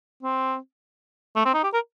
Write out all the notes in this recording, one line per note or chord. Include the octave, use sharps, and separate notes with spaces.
C4
A3
C4
D#4
G4
A#4